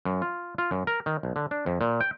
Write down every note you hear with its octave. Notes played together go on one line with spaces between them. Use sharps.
F#2
F4
F4
F#2
A#4
D#3
B1
D3
D4
F2
A#2
G5